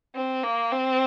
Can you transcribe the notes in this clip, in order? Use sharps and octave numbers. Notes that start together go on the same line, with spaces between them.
C4
A#3
C4